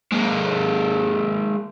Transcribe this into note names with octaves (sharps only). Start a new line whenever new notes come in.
G#3 A#3